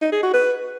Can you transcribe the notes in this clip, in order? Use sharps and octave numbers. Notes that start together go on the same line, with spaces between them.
D#4
G#4
F#4
B4